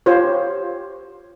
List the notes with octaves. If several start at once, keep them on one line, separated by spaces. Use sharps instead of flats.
F4 G4 C5 C#5